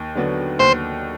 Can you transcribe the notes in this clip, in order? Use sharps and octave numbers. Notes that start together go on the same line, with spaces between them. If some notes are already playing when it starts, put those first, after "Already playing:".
Already playing: D#2
D3 F#3 B3 D4
D#2 C5